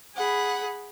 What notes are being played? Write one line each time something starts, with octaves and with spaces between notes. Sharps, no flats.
G#4 F#5 B5